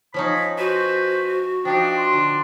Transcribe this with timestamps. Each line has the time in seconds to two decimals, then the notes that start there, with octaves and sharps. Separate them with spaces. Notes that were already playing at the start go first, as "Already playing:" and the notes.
0.14 F3 C#4 D#4 C#5 B5
0.58 F#4 B4 C5
1.65 F3 D4 D#4 G4 G5
1.97 C6
2.13 D3